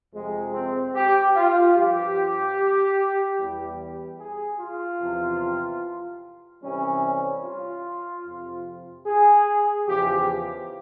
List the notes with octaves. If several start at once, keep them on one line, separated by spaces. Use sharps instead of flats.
F2 C3 F3 G#3
C4
G4
F4
G2 F3 G4
E2 E3 G3
G#4
F4
E2 C3 F3
C2 C3 E3 G3 C#4
F4
F2 C3 F3
G#4
E2 C#3 F3 G4